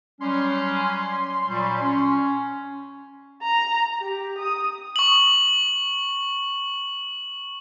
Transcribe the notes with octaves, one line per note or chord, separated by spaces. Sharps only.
F#3 G3 C#4 C6
A#2 F#3 G3
C#4
A#5
G4
D#6
C#6 F#7